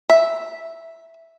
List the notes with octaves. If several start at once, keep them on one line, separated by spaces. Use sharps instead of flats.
E5